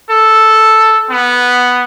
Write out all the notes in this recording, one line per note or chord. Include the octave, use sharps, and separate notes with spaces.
A4
B3